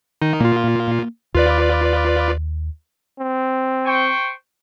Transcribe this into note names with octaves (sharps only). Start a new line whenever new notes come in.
D#3 D#4
A#2 A#3 F4
D#2 F4 B4 D5
C4
C5 G5 C#6